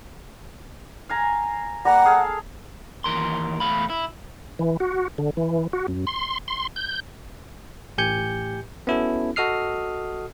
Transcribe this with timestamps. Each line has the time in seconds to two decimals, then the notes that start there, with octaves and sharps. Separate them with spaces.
1.09 F5 G#5 A#5
1.85 G3 A#3 F#5 A#5
2.05 G#4 A4 F5
3.04 D#2 E3 A#4 C6
3.60 E2 G#2 A3 F5 B5
3.90 E4
4.59 E3
4.80 F#4
5.18 D3
5.37 E3
5.73 F#4
5.88 F#2
6.07 C6
6.48 C6
6.76 G6
7.98 A1 A2 G4 G#5 G6 C#7
8.87 B3 C#4 E4 F#4 A4
9.36 F#4 A4 D#5 D#6 F6 C7